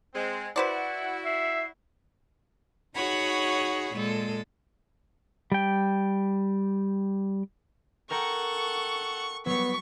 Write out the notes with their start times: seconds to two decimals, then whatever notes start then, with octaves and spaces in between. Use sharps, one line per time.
0.14 G#3 C4
0.56 E4 F#4 B4 C5 D5 F#5
1.26 E5 C7
2.95 D#4 F#4 G#4 C#5 F#5 B5
3.94 A#2 G#3 A4
5.52 G3 G5
8.10 A4 A#4 F#5 G5 A#5 C#6
9.46 F#3 G3 B3 C#6 B6